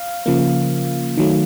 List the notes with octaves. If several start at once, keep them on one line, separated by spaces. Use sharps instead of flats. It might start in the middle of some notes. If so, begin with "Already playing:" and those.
Already playing: F5
C#3 F3 A#3
D#3 F#3 A3